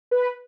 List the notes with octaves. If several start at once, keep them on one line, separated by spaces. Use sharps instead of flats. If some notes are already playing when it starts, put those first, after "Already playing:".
B4